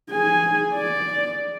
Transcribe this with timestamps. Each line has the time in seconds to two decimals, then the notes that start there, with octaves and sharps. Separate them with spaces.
0.11 G#4 G#5
0.74 D5